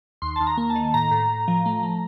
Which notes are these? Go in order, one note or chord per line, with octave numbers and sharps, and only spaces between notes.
D#2 C6
D#2 A5
A#5
A#3
A5
D#3
A2 A#5
A2
A2
F3
A3
A3